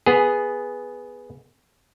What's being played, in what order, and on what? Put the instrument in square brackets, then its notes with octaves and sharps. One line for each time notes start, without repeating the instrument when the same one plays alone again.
[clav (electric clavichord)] B3 G#4